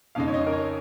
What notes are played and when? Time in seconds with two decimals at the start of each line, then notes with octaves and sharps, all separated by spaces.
0.15 F2 C#3 G#3 D#4 F5
0.28 C#5
0.34 D#5
0.47 A#4
0.52 C#5